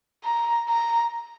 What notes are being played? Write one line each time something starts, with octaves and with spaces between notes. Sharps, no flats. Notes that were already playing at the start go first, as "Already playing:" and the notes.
A#5
A#5